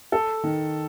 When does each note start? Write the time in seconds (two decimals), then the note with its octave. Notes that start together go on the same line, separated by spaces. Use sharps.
0.12 A4
0.43 D#3